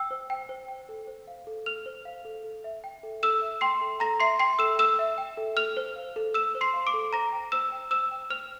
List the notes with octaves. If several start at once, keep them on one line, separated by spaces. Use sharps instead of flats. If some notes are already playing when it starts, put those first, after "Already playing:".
Already playing: G5 E6
C5
G5
C5
G5
A4
C5
F5
A4
A4 F6 F7
C5
F5
A4
A4
E5
G5
A4
A4 E6 E7
E5
G5 C6 C7
A4
A4 A#5 A#6
E5 C6 C7
G5 C6 C7
A4 E6 E7
A4 E6 E7
E5
G5
A4
A4 F6 F7
C5
F5
A4
A4 E6 E7
C5
C6 C7
F5
D6 D7
A4
C5 A#5 A#6
G5
C5 E6 E7
G5
C5 E6 E7
G5
C5 F6 F7